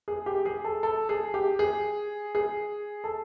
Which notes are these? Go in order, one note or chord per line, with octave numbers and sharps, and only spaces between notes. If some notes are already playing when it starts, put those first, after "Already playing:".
G#4
G4
G#4
A4
A4
G#4
G4
G#4
G#4
A4